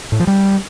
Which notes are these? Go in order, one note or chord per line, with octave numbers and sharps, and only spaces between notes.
A2
F3
G3